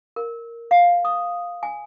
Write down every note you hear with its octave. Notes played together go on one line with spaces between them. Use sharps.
A#4
F5
D#6
G#5